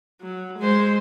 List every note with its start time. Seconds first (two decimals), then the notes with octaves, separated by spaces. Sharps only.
0.21 F#3
0.59 G#3 C5